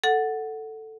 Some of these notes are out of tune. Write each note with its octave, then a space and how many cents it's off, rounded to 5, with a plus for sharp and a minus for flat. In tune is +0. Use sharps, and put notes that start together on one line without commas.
A4 +5 F#5 +0